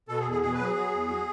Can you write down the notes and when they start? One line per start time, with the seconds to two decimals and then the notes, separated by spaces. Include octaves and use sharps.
0.08 B2 A4
0.20 G#4
0.25 E2
0.31 G#4
0.42 B2 G#4
0.53 B4
0.59 F#3 G#4
0.75 F#3
0.92 E2
1.08 F#3